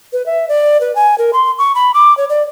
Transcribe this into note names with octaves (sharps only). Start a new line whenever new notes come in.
B4
E5
D5
B4
G#5
A#4
C6
C#6
B5
D6
C#5
D5